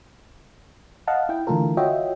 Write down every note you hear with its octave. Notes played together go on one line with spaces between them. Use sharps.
D#5 F5 F#5 A5
E4 G5
D3 E3 A3 F4 A4 A#4
F4 F#4 C#5 D#5 E5 G5